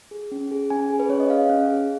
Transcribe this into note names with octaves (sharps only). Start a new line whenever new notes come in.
G#4
C#4
G#4
C#4 G#5
G#4
B4
C#4 C#5
D#5
G#4 F5
C#4
G#4